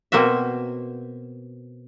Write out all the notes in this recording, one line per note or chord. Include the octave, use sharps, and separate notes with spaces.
B2 A#3 C4 F#4 E5